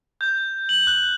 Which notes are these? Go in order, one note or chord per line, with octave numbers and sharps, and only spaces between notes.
G6
F#7
F#6